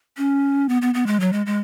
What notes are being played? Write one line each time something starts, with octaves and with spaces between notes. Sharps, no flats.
C#4
B3
B3
B3
G#3
F#3
G#3
G#3